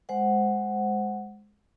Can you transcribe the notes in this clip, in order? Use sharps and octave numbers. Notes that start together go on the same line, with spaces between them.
G#3 C5 F#5